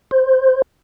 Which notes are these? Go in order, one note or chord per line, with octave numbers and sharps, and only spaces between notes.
C5